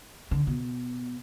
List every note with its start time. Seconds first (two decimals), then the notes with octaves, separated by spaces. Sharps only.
0.31 D3
0.47 B2